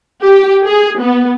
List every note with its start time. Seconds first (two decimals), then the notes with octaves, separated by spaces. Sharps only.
0.25 G4
0.65 G#4
1.00 B3